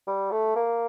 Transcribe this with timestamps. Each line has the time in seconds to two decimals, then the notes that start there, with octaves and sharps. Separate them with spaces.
0.07 G3
0.32 A3
0.56 A#3